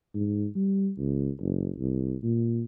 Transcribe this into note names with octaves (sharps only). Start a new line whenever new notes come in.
G#2
G3
C#2
F#1
C2
A#2